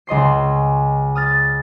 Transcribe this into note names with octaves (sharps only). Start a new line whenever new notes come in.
C#2 D#5 C6 C7
D#6 F6 A6